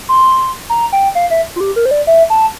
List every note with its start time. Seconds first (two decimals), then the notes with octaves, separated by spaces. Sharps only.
0.09 C6
0.70 A#5
0.92 G5
1.15 F5
1.30 E5
1.56 F4
1.61 G4
1.76 A#4
1.85 C5
1.91 D5
2.07 E5
2.30 A5